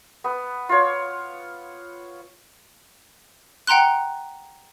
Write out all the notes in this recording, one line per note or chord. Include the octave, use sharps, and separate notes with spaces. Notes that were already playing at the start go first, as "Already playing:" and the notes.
B3
F4 C#5
F#5 G5 A#5 C6 F#6